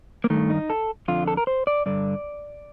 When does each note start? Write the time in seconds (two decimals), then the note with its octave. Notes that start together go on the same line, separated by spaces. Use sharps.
0.24 A#3
0.30 G2 D#3 A3
0.50 D#4
0.70 A4
1.08 F2 D3 F4
1.28 A4
1.37 A#4
1.47 C5
1.67 D5
1.86 G2 D3 D5